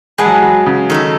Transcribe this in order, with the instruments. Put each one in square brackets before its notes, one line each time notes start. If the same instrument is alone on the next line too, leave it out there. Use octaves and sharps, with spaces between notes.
[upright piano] G#3 [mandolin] G#4 B4 F#5 A5
[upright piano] F#3
G#3
F#3
C#3
[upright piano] D#3 [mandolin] A3 D#4 A4